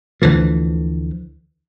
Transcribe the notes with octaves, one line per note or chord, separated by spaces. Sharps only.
D2 D3 E3 F3